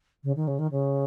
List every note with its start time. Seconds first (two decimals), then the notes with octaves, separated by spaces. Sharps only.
0.23 C#3
0.36 D#3
0.47 C#3
0.59 D#3
0.71 C#3